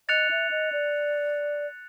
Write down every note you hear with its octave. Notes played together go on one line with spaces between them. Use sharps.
D#5 F#6 A6 C#7 F7
E5
D#5
D5